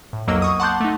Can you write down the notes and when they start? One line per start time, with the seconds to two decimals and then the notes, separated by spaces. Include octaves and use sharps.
0.13 A2
0.27 B1 F2 F#3 A#3 D#5 E6
0.42 C#6 D#6
0.60 F#5 A5 C6 D6 F#6 G6
0.80 A3 D#4